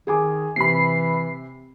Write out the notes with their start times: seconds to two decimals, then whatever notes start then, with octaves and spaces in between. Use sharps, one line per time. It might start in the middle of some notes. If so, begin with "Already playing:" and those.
0.07 D#3 G#4 G#5 D6
0.56 C3 E3 B5 C7